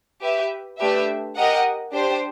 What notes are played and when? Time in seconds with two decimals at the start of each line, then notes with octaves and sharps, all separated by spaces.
0.22 G4 B4 E5
0.79 A3 D4 G4 B4 E5
1.37 G4 A#4 D#5 F#5
1.93 D4 G4 C5